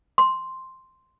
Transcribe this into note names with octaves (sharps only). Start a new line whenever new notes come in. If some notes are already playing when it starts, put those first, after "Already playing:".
C6